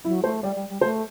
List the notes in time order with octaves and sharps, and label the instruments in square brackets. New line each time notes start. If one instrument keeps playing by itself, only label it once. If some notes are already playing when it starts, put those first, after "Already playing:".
[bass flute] F#3 [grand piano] E4
[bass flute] A3 [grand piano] C5
[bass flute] G3 [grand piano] D5
[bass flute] G3
G3
[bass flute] A3 [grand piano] C5